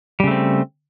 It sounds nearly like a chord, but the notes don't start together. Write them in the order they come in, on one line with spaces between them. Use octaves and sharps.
G3 C#3 A3 C4